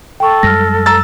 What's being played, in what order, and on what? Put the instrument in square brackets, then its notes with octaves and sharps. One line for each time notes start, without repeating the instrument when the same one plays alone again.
[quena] A4 [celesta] G5 C#6
[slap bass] F#2 G3 G#3 [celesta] F6 A#6
[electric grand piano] A#5 E6 A6